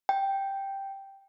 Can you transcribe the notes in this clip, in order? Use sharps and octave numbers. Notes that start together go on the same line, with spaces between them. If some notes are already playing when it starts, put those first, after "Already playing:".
G5